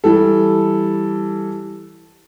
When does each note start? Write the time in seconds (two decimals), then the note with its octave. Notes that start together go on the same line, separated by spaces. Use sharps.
0.04 E3 G3 A4